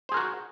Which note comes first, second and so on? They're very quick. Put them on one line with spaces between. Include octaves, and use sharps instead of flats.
C5 G#4 A#4 F#4